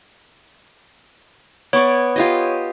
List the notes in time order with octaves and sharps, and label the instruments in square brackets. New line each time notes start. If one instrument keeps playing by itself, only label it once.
[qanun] B3 D5 [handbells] C#5 C#6
[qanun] F4 G4 D#5